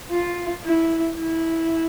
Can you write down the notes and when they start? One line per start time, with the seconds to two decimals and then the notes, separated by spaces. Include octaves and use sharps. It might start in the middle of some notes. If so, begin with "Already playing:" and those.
0.11 F4
0.64 E4
1.16 E4